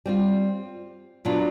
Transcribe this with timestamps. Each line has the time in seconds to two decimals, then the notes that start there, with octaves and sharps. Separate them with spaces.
0.06 G3 C4 F4
1.25 A#2 F#3 B3 D4 F4